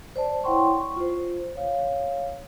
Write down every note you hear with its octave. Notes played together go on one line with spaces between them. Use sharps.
C5 D5 A5
E4 C#5 F#5 G5 C6 C#6
C#6
F4 C5
C#5 F5